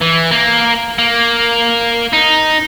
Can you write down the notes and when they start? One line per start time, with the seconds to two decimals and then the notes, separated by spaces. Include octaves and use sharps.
0.01 E3
0.31 A#3
0.98 A#3
2.13 D#4